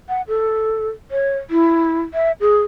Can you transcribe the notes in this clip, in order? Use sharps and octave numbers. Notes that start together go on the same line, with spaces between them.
F#5
A4
C#5
E4
E5
G#4